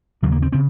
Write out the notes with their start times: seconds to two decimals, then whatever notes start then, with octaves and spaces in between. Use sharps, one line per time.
0.23 D#2 C#3 F#3
0.32 A#3
0.42 C4
0.52 C#3 C4